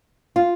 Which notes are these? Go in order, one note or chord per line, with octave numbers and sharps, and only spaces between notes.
F4